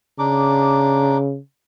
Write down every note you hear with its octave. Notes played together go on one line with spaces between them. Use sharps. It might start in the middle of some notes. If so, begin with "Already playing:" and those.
C#3 D4 D#4 D6